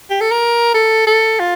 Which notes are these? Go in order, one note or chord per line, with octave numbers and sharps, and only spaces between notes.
G4
A4
A#4
A4
A4
F4